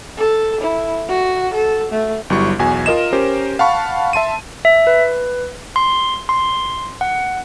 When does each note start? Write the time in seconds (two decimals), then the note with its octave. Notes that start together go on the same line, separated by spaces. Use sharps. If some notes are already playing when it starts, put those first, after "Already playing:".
0.17 A4
0.61 E4
1.08 F#4
1.54 A4
1.92 A3
2.30 G1 F#3 G3 E4 C#6
2.59 B1 E2 F#4 G#5
2.86 F4 A#4 D#5 E7
3.13 C#4 G4 A#4 C5
3.59 F5 F#5 A5 B5 C#6
4.13 E5 A5 C6 D#7
4.65 E5
4.87 B4
5.76 C6
6.29 C6
7.01 F#5